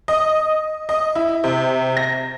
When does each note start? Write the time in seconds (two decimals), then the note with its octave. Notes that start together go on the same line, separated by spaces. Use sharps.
0.08 D#5
0.89 D#5
1.15 E4
1.44 C3
1.97 A#6